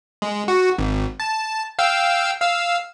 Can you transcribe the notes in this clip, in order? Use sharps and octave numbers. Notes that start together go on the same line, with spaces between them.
G#3
F#4
G#1
A5
F5 G5 E6
F5 E6